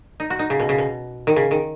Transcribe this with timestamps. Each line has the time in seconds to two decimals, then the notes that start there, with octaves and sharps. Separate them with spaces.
0.20 D#4
0.30 F#4
0.39 D#4
0.50 C#3
0.60 B2
0.69 C#3
0.78 B2
1.27 D#3
1.36 C#3
1.51 D#3